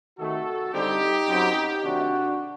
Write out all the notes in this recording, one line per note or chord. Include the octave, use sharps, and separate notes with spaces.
C3 D#3 A3 F#4 A4
D3 G3 C4 D#4 G4
F#2 F#3 C4
C3 D#3 A3 D4 F#4